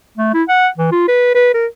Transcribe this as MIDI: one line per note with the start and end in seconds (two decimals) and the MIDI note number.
0.18 0.30 57
0.34 0.43 64
0.49 0.68 78
0.78 0.91 52
0.92 1.06 65
1.08 1.30 71
1.35 1.54 71
1.54 1.66 70